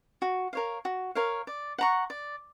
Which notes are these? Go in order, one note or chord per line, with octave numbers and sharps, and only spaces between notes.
F#4
A#4 C#5 F5
F#4
A#4 C#5 F5
D5
F#5 A#5 C#6
D5